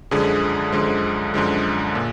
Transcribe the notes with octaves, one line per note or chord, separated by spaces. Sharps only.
F#2 D3 F3 G#3 G#4
F#2 D3 F3 G#3
F#2 D3 F3 G#3
A#2